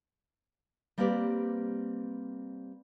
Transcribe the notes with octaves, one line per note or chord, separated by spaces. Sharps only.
G3 A#3 C4 G4 B4 D5